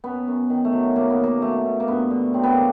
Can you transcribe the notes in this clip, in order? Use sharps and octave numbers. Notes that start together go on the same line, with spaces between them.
F#2 B3
F#2
D#3
A3
F#3
F#3 A#3
B3
B2 A#3
F#3 A3
B2
A#3
G2 B3
D3
F#3 C4
B3
D3 A#3